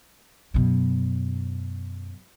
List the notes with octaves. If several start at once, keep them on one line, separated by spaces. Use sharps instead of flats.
F#2 B2